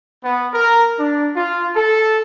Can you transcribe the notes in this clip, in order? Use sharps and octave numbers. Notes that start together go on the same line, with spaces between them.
B3
A#4
D4
F4
A4